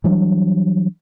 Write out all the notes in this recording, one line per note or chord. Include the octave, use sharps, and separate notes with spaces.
E3 F#3 G3 D4